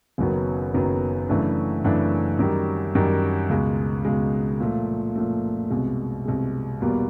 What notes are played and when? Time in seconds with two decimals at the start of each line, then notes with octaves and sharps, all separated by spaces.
0.18 F#1 F#2 D#3 F#3 B3
0.74 F#1 F#2 D#3 F#3 B3
1.28 F#2 C#3 E3 A3 D4
1.84 F#2 C#3 E3 A3 D4
2.39 F#2 D#3 G3
2.95 F#2 D#3 G3
3.49 C#2 B2 G#3
4.05 C#2 B2 G#3
4.60 A#2 F3 A3
5.16 A#2 F3 A3
5.70 C2 B2 G#3
6.25 C2 B2 G#3
6.81 E2 B2 G3 A#3